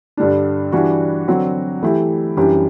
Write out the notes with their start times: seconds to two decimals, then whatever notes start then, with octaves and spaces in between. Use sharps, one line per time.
0.17 G2 D3 G3 D4
0.72 E3 G3 D4 F#4
1.27 D3 F#3 C4 F#4
1.83 E3 A3 E4 G4
2.37 F#2 E3 G3 D4 G4